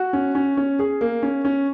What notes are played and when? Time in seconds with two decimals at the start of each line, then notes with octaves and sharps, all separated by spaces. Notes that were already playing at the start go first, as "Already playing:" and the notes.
Already playing: F#4
0.13 C#4
0.35 C#4
0.57 C#4
0.79 G#4
1.01 A#3
1.23 C#4
1.45 C#4